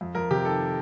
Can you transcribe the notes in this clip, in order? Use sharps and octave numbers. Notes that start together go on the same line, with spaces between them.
F2
F2 A#4
C3 G4
D#3 A4